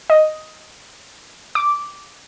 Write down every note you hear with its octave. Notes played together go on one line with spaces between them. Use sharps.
D#5
D6